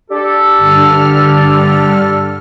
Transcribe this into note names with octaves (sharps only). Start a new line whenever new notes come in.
D4 G4 A4
G2 D3 F6